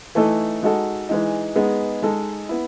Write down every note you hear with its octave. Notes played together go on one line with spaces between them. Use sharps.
E3 A3 D#4 A4
G#3 D#4 F#4 A4
E3 G#3 D#4
G#3 B3 D#4 G#4
G#3 D#4 A4
B3 E4